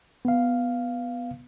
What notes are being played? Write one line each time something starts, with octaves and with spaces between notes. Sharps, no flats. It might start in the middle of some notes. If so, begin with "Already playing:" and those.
B3 F5